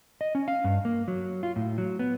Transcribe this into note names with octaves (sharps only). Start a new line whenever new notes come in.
D#5
C#4
F5
G2
A#3
F#3
F4
A2
F#3
B3